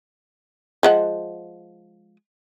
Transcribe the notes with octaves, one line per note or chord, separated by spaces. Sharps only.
F3 G#3 F#5